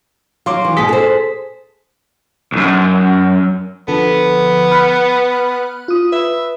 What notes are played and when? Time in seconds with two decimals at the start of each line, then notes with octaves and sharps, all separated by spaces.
0.46 F#3 F5 C6 D6
0.65 E3
0.77 G#2 B2 G#4 B6
0.89 A4 C5
2.52 B1 F#2
3.88 D3 F3 B3 A4
4.71 B5 F6 F#6
5.88 F4 D#6
6.12 B4 E5